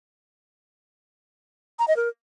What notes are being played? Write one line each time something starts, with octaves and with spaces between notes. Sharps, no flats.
A#5
D#5
A#4